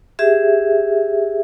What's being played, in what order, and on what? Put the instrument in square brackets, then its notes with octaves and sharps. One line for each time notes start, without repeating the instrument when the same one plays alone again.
[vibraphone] G4 G#4 E5